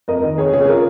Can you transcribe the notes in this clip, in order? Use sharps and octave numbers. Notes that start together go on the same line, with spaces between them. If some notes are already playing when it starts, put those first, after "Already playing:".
F2 A#4 D#5
D#3
F2 G#4 C#5
C#3 G#4 C#5
F4 A#4